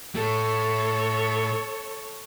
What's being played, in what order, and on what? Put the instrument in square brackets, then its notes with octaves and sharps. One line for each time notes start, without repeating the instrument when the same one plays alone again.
[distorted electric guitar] A2 [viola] A4 C#5